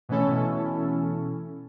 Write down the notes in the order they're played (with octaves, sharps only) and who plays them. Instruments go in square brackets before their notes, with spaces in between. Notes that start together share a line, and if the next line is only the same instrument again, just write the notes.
[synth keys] B2 E3 A3 C#4 E4 A4